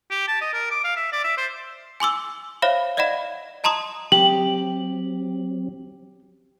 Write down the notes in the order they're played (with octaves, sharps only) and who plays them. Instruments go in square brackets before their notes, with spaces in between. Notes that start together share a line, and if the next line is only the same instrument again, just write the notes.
[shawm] G4
A5
D#5
A#4
D6
F5
E5
D5
E5
C5
[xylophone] G#5 C6 D6 E6
C5 C#5 E5 F5 B5
D5 D#5 F5 F#5 B5
D#5 A5 A#5 C6 D#6
[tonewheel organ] F#3 C4 [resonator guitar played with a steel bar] G4 [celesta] F#7